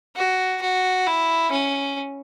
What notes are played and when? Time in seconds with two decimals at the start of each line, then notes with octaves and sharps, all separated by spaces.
0.16 F#4
0.61 F#4
1.07 E4
1.52 C#4